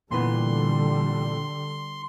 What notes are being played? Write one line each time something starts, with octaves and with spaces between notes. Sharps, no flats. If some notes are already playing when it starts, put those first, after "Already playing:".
A#2 D3 E3 G3 B3 C6